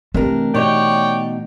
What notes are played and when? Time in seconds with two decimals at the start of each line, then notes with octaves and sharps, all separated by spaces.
0.14 C3 E3 A3 D4 A#4
0.55 B2 D#4 C#5 D5 G5